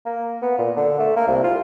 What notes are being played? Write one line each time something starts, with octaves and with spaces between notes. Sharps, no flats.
A#3
B3
A#2
D3
A3
A#3
C2
F4